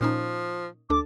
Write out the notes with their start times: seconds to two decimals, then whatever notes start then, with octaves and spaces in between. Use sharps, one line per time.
0.01 A#2 F3 C#4 D#4
0.90 D2 D4 A4 D6